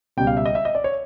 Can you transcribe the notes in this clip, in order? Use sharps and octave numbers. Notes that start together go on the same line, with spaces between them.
C#2 B2 G3 G5
F5
E5
D#5
E5
D#5
D5
C#5